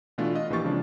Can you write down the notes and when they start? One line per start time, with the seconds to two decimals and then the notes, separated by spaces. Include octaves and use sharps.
0.18 B2 E3 A3 D4 F4
0.35 F4 D#5 F5
0.50 A#1 E3 A#3 G4 C#6 A6
0.64 C#3 F3 G#3 C4 D4